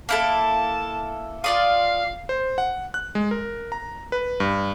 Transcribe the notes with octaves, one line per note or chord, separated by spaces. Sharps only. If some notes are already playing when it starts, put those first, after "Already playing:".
A#3 E4 A4 A5
F4 D5 F5 D#6
C5
F#5
F#6
G#3
A#4
A#5
B4
G2